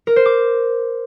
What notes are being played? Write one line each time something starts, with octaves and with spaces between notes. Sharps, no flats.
A#4
C5
D6